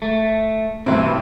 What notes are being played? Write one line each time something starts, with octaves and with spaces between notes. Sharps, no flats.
A3
G2 B2 E3 C4